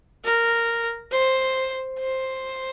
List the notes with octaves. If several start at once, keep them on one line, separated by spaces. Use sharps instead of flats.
A#4
C5
C5